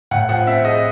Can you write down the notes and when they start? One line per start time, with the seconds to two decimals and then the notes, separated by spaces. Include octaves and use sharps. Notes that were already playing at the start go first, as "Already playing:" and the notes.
0.11 A2 F#5
0.29 F3 F#5
0.47 C4 E5
0.65 G#3 D#5